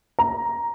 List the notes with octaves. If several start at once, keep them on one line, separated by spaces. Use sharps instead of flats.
A#5